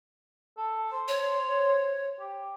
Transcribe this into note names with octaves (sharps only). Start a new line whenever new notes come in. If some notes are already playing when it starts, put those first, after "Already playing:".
A4
C5
C#5
G4